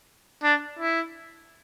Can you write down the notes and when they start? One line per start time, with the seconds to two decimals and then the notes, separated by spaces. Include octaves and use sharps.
0.43 D4
0.79 E4